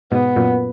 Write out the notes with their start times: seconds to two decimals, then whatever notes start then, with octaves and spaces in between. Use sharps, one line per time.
0.12 G#2 B2 B3
0.36 F#2 A#2